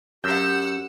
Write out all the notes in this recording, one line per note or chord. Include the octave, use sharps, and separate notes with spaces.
F#2 G4 F#5 E6 G6